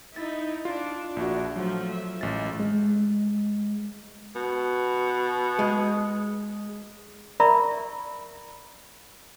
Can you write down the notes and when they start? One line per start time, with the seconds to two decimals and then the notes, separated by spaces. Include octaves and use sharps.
0.16 D#4 E4 A6
0.65 D4 F4
1.16 A#1 F#4
1.56 F3 F#3 A3
1.89 E5
2.21 A1 G#3 A6
2.60 G#3
4.36 B2
5.59 G#3
7.40 A#4 D5 E5 A#5 B5 C#6